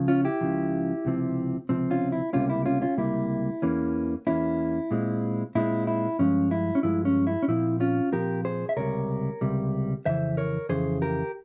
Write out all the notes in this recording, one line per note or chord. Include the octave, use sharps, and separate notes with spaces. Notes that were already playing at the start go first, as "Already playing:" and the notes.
Already playing: C#2 C#3 F3
C#4 F4
E4 G4
C#2 C#3 F3
C#2 C3 F3 C4
C#2 C3 F3 C4
C#4 F4
E4
C#2 C3 G3 A#3 C#4 F4
E4
C#4 F4
C#4 F4
C#2 C3 G3 A#3 E4
E2 E3 A#3 C#4
E2 E3 A#3 C#4 E4
A#2 G#3 C4
A#2 G#3 C4 E4
E4
G2 F3 G#3 C#4
E4
C#4
G2 F3 G#3 E4
C#4
E4
C#4
A#2 F3 C4 E4
C#4 F4
A#2 F3 C4 G4 A#4
G#4 C5
E5
C#2 C3 G3 A#4 C#5
C#2 C3 G3
F2 C#3 E3 C5 E5
A#4 C#5
F2 C#3 E3 G#4 C5
G4 A#4